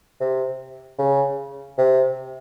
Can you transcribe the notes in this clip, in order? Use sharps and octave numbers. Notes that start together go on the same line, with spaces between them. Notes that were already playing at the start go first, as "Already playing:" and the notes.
C3
C#3
C3